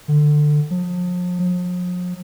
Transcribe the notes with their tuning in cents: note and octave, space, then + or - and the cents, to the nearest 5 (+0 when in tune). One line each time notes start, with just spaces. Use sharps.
D3 +20
F3 +40
F3 +45